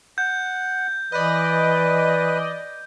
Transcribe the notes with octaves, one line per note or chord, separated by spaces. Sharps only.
F#5 G6
E3 B4 D5 D#5